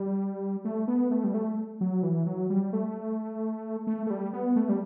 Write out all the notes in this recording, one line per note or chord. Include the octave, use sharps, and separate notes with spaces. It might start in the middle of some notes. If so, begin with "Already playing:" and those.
Already playing: G3
A3
B3
A3
G3
A3
F#3
E3
F#3
G3
A3
A3
A3
G3
B3
A3
G3